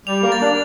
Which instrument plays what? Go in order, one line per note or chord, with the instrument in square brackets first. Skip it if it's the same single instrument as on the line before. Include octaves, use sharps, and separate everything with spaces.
[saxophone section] G3 [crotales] F7
[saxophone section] A#3
[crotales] A6
[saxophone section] D4